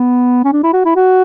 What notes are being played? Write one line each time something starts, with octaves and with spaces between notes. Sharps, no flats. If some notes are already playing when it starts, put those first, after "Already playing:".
Already playing: B3
C#4
D4
E4
F#4
E4
F#4